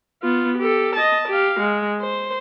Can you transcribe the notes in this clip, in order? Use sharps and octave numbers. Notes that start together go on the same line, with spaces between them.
B3 F4
G4 A4
D#5 A5
G4 F5
G#3
C5